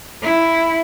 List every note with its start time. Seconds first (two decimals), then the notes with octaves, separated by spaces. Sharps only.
0.23 E4